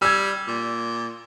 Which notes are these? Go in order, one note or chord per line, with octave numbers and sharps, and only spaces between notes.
G3 E6 G#6
A#2